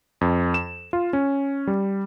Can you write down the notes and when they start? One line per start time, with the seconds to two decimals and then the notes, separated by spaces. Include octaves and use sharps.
0.21 F2
0.54 E7
0.93 F4
1.13 C#4
1.67 G3